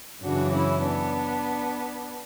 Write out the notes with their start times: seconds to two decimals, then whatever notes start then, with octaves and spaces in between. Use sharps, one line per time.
0.23 F#2 C#3 E3 D4 F#4
0.53 C#4 E4
0.82 B3 D4